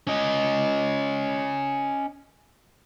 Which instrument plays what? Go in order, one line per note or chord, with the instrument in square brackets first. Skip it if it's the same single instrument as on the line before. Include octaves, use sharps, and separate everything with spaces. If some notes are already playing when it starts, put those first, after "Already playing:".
[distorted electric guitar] C#4 D#5